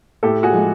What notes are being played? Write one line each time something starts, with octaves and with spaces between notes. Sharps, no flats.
A2 G4 A4
F#4 G#4
F3 G#3